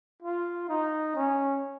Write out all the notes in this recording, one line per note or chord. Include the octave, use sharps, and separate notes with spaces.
F4
D#4
C#4